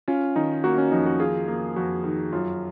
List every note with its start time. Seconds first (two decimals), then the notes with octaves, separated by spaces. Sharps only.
0.08 C#4 F4
0.36 D#3 D#4
0.64 A#3 F#4
0.78 C#4
0.92 F2 D#4
1.06 F#4
1.20 F4 G#4
1.48 A#3
1.76 F2 F#4
2.04 D#3
2.32 F#2 F4